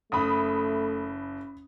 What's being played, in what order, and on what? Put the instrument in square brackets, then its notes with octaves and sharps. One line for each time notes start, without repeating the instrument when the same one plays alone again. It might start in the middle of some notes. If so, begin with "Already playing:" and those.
[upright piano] F#1 [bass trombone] A3 [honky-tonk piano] B5 D#6